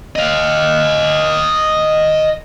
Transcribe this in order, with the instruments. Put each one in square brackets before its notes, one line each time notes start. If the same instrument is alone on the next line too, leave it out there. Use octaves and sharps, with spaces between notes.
[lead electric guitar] D#5 F5